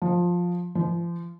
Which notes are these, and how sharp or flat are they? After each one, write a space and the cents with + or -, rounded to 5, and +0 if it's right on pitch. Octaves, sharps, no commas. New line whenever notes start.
F3 +10
F3 -35